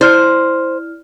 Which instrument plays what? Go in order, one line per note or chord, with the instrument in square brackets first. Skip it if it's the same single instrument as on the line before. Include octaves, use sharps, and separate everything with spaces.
[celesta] E4 D5 F6 [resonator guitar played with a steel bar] C5